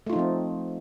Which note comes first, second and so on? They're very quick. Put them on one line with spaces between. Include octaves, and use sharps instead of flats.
A3 F4 D#4 F3 C4